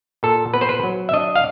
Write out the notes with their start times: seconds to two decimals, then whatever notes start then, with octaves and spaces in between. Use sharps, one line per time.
0.23 A#2 A4
0.54 B3 B4
0.61 C5
0.69 B4
0.83 F#3
1.09 E5
1.13 D4 D#5
1.36 F5